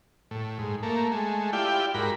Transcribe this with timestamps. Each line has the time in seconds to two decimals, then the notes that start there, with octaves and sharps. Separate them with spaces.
0.31 A2
0.59 G#2
0.83 A3 A#3
1.12 G#3 A3
1.53 E4 F4 G4 D5 G5
1.94 G#2 F#4 A#4 B5